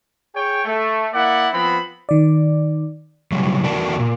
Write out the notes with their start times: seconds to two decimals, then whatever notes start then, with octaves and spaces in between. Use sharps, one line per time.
0.34 G#4 C#5 G5
0.65 A3
1.12 A#3 E4 D5 F#5
1.52 F3 B3 C4 B5
2.09 D#3 D5
3.32 A2 C#3 F#3 G3
3.64 E2 A3 F#4 A#4 D5 A5
3.99 A#2